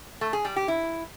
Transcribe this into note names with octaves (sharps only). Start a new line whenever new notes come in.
A3
G#4
G3
G4
E4